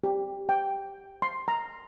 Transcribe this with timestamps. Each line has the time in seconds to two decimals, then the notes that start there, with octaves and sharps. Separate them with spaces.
0.04 G4
0.49 G5
1.22 C6
1.48 A#5